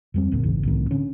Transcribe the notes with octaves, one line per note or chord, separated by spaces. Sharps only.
F2 G3 C4
G1 D2 A#2
G#1 G#2 C#3 E3
C2 A2 D#3
D3 C#4